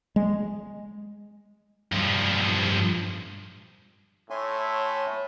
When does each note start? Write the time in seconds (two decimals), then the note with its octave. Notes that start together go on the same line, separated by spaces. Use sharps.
0.16 G#3
1.92 G2 F3
4.30 A2 C#5 E5 G#5 C6